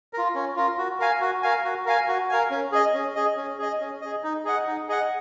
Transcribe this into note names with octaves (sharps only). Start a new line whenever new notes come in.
F4 A#4
C#4
F4 A#4
F#4
A#4 F5 G#5
F#4
A#4 F5 G#5
F#4
A#4 F5 G#5
F#4
A#4 F5 G#5
C#4
G#4 D#5
C#4
G#4 D#5
C#4
G#4 D#5
C#4
G#4 D#5
D#4
G#4 D#5 F#5
D#4
G#4 D#5 F#5